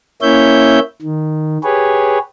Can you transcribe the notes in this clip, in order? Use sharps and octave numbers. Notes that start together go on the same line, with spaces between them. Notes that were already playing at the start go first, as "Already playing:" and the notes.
A#3 C#4 E4 C#5 E5 G6
D#3
G4 G#4 B4 C#5